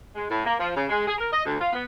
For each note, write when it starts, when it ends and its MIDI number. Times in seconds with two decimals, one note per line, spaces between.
0.16 0.26 56
0.30 0.45 45
0.45 0.53 58
0.59 0.70 53
0.75 0.84 49
0.89 1.05 56
1.06 1.14 68
1.19 1.30 70
1.31 1.43 75
1.45 1.58 38
1.59 1.72 65
1.73 1.83 59